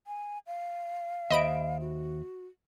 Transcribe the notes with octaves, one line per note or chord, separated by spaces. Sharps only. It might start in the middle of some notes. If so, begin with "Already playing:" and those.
G#5
F5
D#2 C5 D#5 E5 B5 D7
F#4